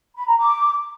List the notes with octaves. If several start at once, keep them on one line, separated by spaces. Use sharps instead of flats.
B5
A#5
D6